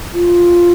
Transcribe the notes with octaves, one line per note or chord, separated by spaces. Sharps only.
F4